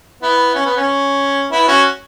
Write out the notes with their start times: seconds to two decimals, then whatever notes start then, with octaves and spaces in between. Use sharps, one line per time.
0.22 B3 E4
0.55 C#4
0.65 B3
0.76 C#4
1.51 B3 E4
1.68 C#4 F#4